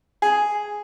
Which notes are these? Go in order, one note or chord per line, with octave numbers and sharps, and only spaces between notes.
G#4